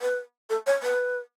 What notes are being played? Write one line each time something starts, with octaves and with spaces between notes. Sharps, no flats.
B4
A4
C#5
B4